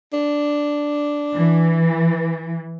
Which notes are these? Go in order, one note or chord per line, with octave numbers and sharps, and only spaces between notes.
D4
E3